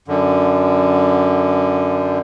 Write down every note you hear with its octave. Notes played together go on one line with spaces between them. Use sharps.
F#2 D3